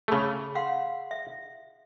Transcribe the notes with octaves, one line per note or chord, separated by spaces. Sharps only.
C#3 A3 G#4 B5
F5 F#5 C6
E5